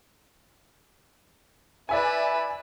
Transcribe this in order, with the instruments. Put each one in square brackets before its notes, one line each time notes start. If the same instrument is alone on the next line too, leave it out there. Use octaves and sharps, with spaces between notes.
[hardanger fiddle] E4 B4 [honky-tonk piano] D5 E5 G#5